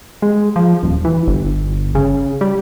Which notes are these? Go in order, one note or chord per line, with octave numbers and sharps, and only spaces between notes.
G#3
F3
D#1
E3
G1
C#3
G3